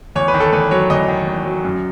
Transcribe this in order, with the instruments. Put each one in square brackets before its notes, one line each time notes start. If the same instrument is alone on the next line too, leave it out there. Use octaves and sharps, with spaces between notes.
[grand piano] E2 C#5
B4
D#3
A4
E2 B4
F#3 C#5
E2 D#5
D#3
E2
F#3
F#2